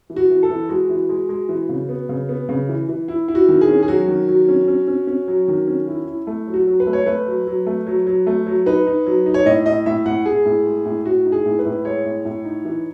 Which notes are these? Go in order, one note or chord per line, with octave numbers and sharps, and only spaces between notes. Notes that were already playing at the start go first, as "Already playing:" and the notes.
E3
F#4
E3
A4
E3
G#3 F#4
E3
G#3
G#3
E3
C#3
B3
C#3
B3
C#3
E3
E3
E4
E4
F#4
D#3
G#4
C#4
G#4
F#3 F#4
D#3
F#3
C#4
C#4
C#4
C#4
F#3
D#3
C#4
E4
E4
A3
F#3
F#4
F#3
B4
A3
C#5
A3 B4
F#3
F#3
A3
F#3
F#3
A3
F#3
D#4 B4
D#4
F#3
D#4
C#5
A2 D#5
A2 D#5
A2 E5
A2 F#5
A2 G#4
A2
G#3
A2
A2 F#4
D#4
G#4
A2
B4
A2
G#3 C#5
A2
A2
D#4
E3